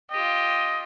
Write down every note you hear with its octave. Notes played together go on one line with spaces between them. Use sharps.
F4 G4 D#5